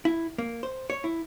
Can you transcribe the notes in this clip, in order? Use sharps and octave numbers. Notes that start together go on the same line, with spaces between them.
E4
A#3
C5
C#5
E4